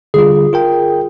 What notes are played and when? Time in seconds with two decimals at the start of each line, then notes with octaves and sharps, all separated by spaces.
0.14 D3 G3 F4 G#4
0.53 F4 A#4 G5